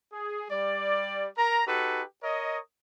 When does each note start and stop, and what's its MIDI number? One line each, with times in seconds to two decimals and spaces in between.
0.13 0.43 68
0.50 1.27 55
0.50 1.27 74
1.37 1.64 70
1.37 1.64 82
1.67 2.02 63
1.67 2.02 66
1.67 2.02 67
1.67 2.02 69
1.67 2.02 71
2.23 2.59 70
2.23 2.59 73
2.23 2.59 75